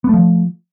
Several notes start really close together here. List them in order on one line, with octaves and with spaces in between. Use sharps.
B3 A3 F3